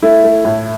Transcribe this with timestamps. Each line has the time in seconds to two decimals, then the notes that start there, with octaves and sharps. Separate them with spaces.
0.02 A3 E4
0.24 A3
0.45 A2